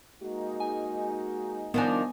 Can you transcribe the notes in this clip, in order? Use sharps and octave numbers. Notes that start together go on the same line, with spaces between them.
G#3 A#3 D#4 F#4
G#5
D#3 F3 B3 D4 G#5